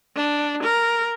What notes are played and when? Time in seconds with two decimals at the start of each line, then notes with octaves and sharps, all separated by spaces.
0.16 D4
0.63 A#4